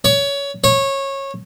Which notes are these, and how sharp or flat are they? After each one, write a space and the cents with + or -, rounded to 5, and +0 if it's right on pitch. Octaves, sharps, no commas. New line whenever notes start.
C#5 +20
C#5 -20